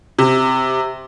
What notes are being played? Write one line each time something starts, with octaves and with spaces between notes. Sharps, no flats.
C3